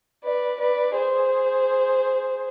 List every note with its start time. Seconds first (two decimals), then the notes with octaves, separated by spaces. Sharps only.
0.24 B4 D5
0.60 B4 D5
0.96 G#4 C5